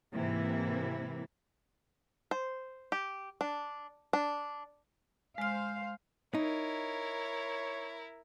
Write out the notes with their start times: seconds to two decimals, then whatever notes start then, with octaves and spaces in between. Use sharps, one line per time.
0.14 G#2 C3 E3 A#3 E4
2.31 C5
2.92 G4
3.41 D4
4.13 D4
5.38 G#3 C5 F5 F6
6.35 D#4 E4 A#4 C#5